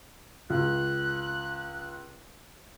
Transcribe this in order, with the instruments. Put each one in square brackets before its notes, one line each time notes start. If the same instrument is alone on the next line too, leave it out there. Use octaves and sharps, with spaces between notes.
[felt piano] C#2 [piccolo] F#6